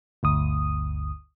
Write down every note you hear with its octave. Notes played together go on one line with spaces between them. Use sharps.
G1 D2 D#6